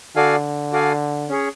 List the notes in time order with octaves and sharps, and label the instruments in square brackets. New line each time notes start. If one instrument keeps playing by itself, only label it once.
[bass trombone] D3 [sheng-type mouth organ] F#4 A4 D5 F5 G#5
[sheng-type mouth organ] F#4 A4 D5 F5 G#5
C#4 G#4 C#5